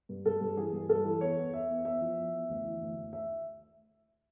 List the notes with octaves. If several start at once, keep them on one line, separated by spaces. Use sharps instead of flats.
G2
G2 A4
G2
E3 G#4
G2
G2 A4
E3
E2 C#5
E2
E2 E5
E2
E2 E5
F3
E2
E2
D2
E3
D2
D2
D2 E5